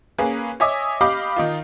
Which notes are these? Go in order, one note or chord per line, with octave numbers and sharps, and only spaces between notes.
A#3 C#4 G#4 B4
C#5 D#5 E5 G#5 D6 D#6
G4 D#5 F5 B5 D6
D#3 D#4 F4